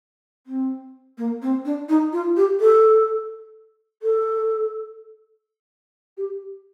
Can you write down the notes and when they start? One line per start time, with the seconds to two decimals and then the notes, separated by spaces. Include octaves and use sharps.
0.47 C4
1.18 A#3
1.42 C4
1.65 D4
1.89 D#4
2.13 F4
2.37 G4
2.60 A4
4.02 A4
6.17 G4